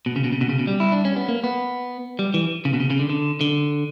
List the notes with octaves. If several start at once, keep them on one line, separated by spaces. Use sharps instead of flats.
B2
C#3
B2
C#3
B2
C#3
B2
G3
E4
D4
C#4
B3
A#3
B3
G3
E3
C#3
B2
C#3
C#3
D3
D3
D3